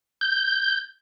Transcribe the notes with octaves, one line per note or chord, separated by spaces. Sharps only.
G6